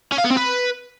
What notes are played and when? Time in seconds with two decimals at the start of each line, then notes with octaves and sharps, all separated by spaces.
0.12 C#4
0.18 F5
0.24 B3
0.31 C4
0.37 B4